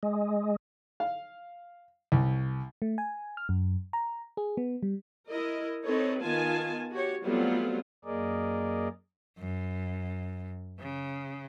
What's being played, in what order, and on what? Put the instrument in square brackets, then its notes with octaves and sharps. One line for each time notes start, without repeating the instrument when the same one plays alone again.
[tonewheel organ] G#3
[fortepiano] F5
C2
[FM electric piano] A3
G#5
F6
F#2
A#5
G#4
B3
G3
[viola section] E4 A#4 D#5
C4 D#4 A4 B4 C#5 D#5
D#3 B3 F4 G#5 A5
F#4 G4 C#5
F#3 G3 A3 B3 C4 F4
[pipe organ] F#2 A#3 G#4 A#4 D5 D#5
[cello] F#2
C#3